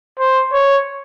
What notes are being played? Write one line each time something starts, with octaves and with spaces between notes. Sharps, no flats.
C5
C#5